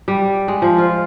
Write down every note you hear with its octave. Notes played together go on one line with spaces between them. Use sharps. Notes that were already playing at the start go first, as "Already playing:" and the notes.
G3
G#3
F3
F4